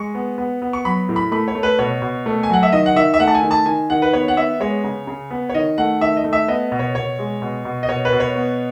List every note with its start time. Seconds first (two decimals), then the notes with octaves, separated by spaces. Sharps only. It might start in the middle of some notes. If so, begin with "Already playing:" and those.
Already playing: G#3 C#6
0.15 B3
0.38 B3
0.62 B3
0.73 C#6
0.85 F#3 B5
1.09 A2
1.16 B5
1.32 A3 B5
1.48 C#5
1.55 A3
1.63 B4
1.79 B2 C#5
2.02 B2
2.26 A3
2.43 G#5
2.50 F#3 F#5
2.63 E5
2.72 D#3 D#5
2.86 F#5
2.95 D#3 E5
3.14 E5
3.20 A3 F#5
3.27 A5
3.35 G#5
3.43 D#3
3.51 A5
3.66 D#3 G#5
3.90 D#3 F#5
4.02 B4
4.13 B3 C#5
4.28 F#5
4.37 B3 E5
4.60 G#3 C#5
4.84 C#3
5.07 C#3
5.31 B3
5.49 C#5
5.54 D#3 D#5
5.78 A3 F#5
6.01 D#3 E5
6.17 D#5
6.24 A3
6.33 E5
6.48 B3 D#5
6.72 B2
6.79 C#5
6.95 B2 C#5
7.19 G#3
7.42 B2
7.65 B2
7.83 D#5
7.89 B2 C#5
8.05 B4
8.12 B2
8.20 C#5
8.36 B3